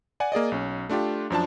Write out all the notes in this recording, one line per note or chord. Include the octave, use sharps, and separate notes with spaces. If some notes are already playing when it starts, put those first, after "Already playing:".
D5 F#5 G#5
A#3 G#4 D5 D#5
B1 C#4
A3 D4 F4 G4
F#2 F3 D4 A5